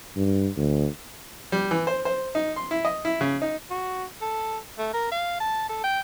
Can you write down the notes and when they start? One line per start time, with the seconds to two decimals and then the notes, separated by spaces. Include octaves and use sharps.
0.16 G2
0.57 D2
1.52 G3
1.71 E3
1.87 C5
2.05 C5
2.35 D#4
2.56 C6
2.71 E4
2.85 D#5
3.05 E4
3.21 C#3
3.42 D#4
3.70 F#4
4.21 A4
4.78 A3
4.94 A#4
5.11 F5
5.40 A5
5.69 A4
5.84 G5